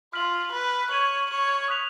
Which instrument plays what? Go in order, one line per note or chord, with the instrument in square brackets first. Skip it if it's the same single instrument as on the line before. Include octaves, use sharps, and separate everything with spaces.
[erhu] F4 [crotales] F6 B6 F#7
[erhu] B4
[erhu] C#5 [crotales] G#6 D#7 F#7
[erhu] C#5
[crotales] D#6 F#6 B6 F7